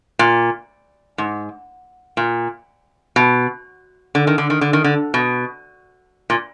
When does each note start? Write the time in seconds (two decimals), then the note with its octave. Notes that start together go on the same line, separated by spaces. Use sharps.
0.19 A#2
1.18 G#2
2.17 A#2
3.16 B2
4.15 D3
4.27 D#3
4.38 D3
4.50 D#3
4.61 D3
4.73 D#3
4.84 D3
5.14 B2
6.30 A#2